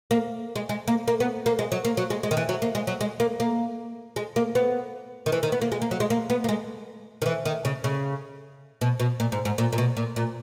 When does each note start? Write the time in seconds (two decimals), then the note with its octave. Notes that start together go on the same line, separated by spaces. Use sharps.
0.11 A#3
0.56 G#3
0.69 G#3
0.88 A#3
1.08 A#3
1.20 B3
1.46 A#3
1.59 G#3
1.72 F#3
1.85 A#3
1.97 F#3
2.10 G#3
2.23 G#3
2.31 D#3
2.37 E3
2.49 F#3
2.62 A#3
2.75 G#3
2.87 F#3
3.01 G#3
3.20 A#3
3.40 A#3
4.16 G#3
4.36 A#3
4.55 B3
5.26 D#3
5.32 E3
5.43 D#3
5.52 B3
5.62 A#3
5.72 G#3
5.82 A#3
5.91 F#3
6.00 G#3
6.10 A#3
6.30 B3
6.44 A#3
6.49 G#3
7.22 D#3
7.26 E3
7.45 D#3
7.65 C#3
7.84 C#3
8.81 B2
9.00 B2
9.20 A#2
9.32 G#2
9.45 G#2
9.58 A#2
9.73 A#2
9.78 B2
9.97 A#2
10.16 A#2